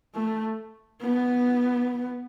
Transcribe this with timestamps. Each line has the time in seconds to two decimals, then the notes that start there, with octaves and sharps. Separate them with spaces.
0.15 A3
1.02 B3